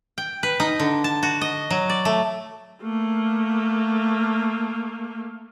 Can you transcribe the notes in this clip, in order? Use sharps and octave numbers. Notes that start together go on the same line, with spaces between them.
G5
B4
D#4
D3
A5
F#4
D#5
F#3
D5
A3
A3 A#3